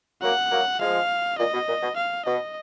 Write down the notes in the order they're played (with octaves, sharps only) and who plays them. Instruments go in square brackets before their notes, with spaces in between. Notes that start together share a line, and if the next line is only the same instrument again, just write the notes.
[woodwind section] F#3 A#3 [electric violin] F#5
[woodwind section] F#3 A#3
[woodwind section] F3 G#3 [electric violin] F5
[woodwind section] A#2 [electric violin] D#5
[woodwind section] B2
A#2
B2
[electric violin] F5
[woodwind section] B2 [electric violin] D#5